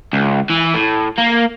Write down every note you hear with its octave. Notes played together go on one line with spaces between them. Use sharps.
C#2
E3
A2
A#3